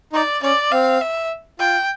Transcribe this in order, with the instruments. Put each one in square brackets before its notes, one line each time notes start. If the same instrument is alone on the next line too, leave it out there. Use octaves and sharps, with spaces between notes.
[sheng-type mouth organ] D#4 [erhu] D5
[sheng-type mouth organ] C#4 [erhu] D5
[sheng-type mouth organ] C4 [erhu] F5
[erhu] E5
[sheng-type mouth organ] F4 [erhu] G5